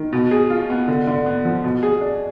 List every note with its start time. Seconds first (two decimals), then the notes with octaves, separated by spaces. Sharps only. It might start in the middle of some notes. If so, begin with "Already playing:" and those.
Already playing: D#3
0.13 B2
0.31 G#4
0.50 F4
0.70 B3
0.88 D3
1.07 D3
1.26 B3
1.45 F3
1.64 B2
1.83 G#4
2.01 D4